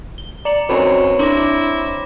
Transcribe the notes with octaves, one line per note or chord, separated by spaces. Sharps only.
G7
D5 A#5 C#7 F#7
F#2 C4 D#4 B4 C#5
D4 E4 C6 D6 A#6